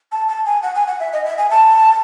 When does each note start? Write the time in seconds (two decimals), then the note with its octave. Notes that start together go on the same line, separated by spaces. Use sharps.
0.12 A5
0.29 A5
0.46 G#5
0.63 F#5
0.75 G#5
0.88 F#5
1.00 E5
1.13 D#5
1.25 E5
1.38 G#5
1.51 A5